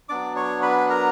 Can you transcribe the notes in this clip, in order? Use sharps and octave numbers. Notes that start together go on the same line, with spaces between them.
F#3 B3 D4 D5 D6
C#5 C#6
B4 B5
A#4 A#5